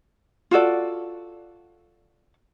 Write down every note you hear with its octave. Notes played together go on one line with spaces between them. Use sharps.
F4 F#4 A4 D5